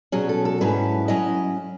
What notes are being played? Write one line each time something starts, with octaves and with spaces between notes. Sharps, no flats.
B2 F#3 C#4 G#4
A4
A4
G#2 F#3 C#4 E4 B4
F#3 C#4 E4 D#5